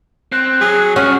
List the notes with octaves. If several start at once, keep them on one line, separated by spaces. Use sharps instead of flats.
C4 F#6
F#3 G#4
G3 C#4 F#4 G#4 F6